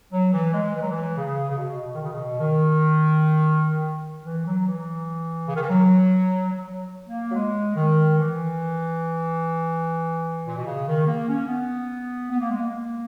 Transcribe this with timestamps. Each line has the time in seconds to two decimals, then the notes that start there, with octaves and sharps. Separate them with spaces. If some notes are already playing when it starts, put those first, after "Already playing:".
0.12 F#3
0.33 E3
0.54 G#3
0.75 E3
0.82 F#3
0.91 E3
1.16 C#3
1.50 C#3
1.57 B2
1.84 B2
1.95 D#3
2.03 C#3
2.12 B2
2.40 D#3
4.25 E3
4.46 F#3
4.67 E3
5.47 C#3
5.55 D#3
5.62 E3
5.70 F#3
6.52 F#3
7.08 A#3
7.31 F#3
7.35 G#3
7.76 D#3
8.18 E3
10.48 A#2
10.57 B2
10.66 C#3
10.87 D#3
11.07 A#3
11.28 C#4
11.48 B3
12.31 B3
12.40 A#3
12.51 G#3
12.60 A#3